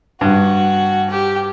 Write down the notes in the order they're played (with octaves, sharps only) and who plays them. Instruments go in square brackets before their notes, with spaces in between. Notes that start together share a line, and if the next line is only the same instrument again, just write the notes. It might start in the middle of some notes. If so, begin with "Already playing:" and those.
[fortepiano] G2 [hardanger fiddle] F#4
[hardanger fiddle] G4